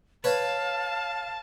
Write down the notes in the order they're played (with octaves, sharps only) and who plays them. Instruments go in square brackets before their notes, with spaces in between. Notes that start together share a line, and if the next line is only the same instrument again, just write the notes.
[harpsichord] B4 C#5 [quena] F5 [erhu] A5